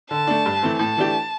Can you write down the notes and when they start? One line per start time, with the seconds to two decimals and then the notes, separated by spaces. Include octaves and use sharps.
0.11 D3 A5
0.27 A3 D4
0.46 G2
0.63 E3 A3 C4
0.79 A2 A5
0.97 E3 A3 D4 G4